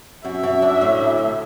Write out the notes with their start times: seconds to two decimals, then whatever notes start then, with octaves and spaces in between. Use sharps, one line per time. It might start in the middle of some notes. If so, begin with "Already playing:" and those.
0.25 F#2 E5
0.43 F#2
0.62 D4
0.81 A2
1.00 D2
1.19 D2